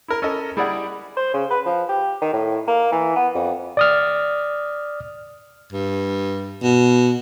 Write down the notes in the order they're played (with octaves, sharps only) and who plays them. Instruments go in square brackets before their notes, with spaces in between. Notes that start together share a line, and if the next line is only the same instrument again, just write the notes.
[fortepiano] E4 A#4
C#4 A4 A#4 D#5
G3 E4 G#4 D5 F#5
[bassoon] C5
C#3
B4
F3
G4
D#3
A2
A#3
E3
B3
F2
[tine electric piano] D5 D#6 F6
[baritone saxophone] G2
B2